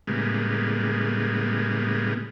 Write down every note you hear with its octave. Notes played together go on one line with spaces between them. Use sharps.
A2 C#3 G3 G#3 A#3 B3